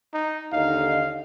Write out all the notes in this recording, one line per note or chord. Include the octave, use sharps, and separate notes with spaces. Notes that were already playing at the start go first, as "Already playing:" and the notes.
D#4
D#2 D3 D#4 F5